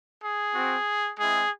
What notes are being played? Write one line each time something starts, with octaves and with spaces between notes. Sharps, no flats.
G#4
C4 F#4
G#3 C4 E4 G#4